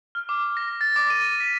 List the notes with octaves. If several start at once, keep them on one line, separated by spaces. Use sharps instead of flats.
F6
D6
A#6
A6
D6
D#7
B6